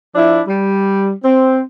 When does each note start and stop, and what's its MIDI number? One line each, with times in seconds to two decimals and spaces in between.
0.15 0.41 53
0.15 0.41 62
0.15 0.41 64
0.47 1.11 55
1.24 1.60 60